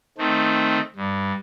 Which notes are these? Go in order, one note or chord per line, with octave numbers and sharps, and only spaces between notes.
D#3 A3 C4
G2